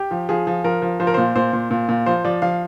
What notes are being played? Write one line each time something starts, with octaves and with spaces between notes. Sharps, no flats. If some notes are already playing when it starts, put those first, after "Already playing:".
Already playing: G4
F3
F3 G#4
F3
F3 A#4
F3
F3 C5
A#4
A#2 C5
A#2 C5
A#2
A#2
A#2
F3 C5
F3 D5
F3 F5